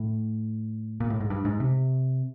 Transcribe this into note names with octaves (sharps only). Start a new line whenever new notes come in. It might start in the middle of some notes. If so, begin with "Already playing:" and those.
Already playing: A2
A#2
A2
G#2
G2
G#2
C3